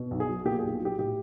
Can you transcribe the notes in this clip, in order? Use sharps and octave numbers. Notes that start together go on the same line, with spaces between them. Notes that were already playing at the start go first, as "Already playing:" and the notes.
Already playing: B2
B1
G#4
F#3
A#2 G4
G#4
B1
F#3 G4
A2 G4